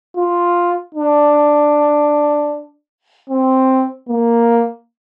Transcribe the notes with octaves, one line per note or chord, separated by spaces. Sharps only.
F4
D4
C4
A#3